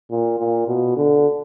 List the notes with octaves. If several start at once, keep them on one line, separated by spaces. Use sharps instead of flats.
A#2
A#2
B2
D3